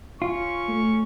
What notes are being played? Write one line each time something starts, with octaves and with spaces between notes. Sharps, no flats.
C#4 F4 C#6
A3